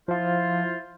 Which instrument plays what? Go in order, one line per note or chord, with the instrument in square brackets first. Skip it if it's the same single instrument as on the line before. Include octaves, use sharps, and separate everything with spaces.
[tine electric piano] F3 F5 [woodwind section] E4 F4 C5